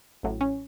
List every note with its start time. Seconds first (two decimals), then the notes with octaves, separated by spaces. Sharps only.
0.23 A1 A2 F#3
0.41 C#4